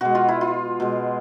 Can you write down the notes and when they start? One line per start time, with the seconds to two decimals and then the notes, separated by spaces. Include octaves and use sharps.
0.01 B2 G#3 F#4
0.15 F4
0.29 E4
0.41 F4
0.80 B2 G#3